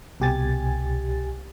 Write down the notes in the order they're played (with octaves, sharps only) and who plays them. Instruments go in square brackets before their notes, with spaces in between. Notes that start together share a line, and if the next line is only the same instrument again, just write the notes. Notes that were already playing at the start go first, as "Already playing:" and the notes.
[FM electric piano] C2 B2 G4 G#5 A6